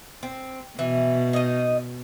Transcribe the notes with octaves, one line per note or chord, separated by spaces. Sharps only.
C4
B2 E3
D#4 D#5